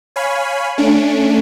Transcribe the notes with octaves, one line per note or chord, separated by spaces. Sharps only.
C#5 F5 G#5 B5
A3 C#4 D4 D7